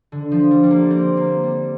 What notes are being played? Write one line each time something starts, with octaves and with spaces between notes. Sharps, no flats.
D3
F3
G3
G3
A#3
C4
A#3
G3